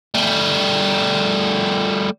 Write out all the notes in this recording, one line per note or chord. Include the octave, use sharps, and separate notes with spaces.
G3 A3